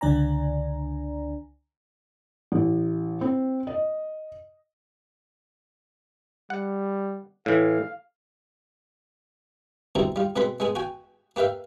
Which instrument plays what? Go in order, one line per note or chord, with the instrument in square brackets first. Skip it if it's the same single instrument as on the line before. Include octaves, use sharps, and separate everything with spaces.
[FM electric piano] C#2 D3 D4 D5 G#5 A#5
[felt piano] A1
C4
D#5
[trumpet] G3 [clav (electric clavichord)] F#5
[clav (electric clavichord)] A2 E3 [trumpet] F5
[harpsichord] D2 B2 G3 C4 E4 A#5
G3 F4
B2 G#3 C4 B4 B5 C6
G#3 B3 G#4 G#5
F#4 G5 G#5
A#3 G4 B4 E5 F5